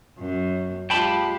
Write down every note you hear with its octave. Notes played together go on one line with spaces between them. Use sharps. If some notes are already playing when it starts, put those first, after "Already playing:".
F#2
G#3 F4 G4 G5 A5 B5